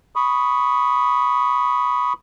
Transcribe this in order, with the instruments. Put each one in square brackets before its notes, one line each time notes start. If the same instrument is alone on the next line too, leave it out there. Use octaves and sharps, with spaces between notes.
[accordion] B5 C#6 D#6